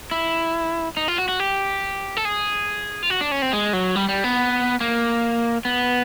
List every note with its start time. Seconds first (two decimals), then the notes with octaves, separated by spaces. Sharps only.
0.11 E4
0.97 D#4
1.08 F4
1.18 F#4
1.28 F#4
1.40 G4
2.17 A4
2.25 G#4
3.02 F4
3.10 F#4
3.21 D4
3.31 C#4
3.42 C4
3.53 G#3
3.73 F#3
3.96 G3
4.09 G3
4.24 B3
4.81 A#3
5.65 B3